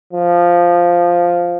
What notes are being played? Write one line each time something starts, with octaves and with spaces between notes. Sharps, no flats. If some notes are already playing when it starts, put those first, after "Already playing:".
F3